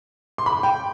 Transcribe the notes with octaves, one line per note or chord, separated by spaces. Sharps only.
C6
B5
G5